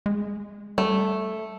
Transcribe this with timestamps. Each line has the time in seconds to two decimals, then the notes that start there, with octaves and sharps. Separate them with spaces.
0.06 G#3
0.78 G3 A3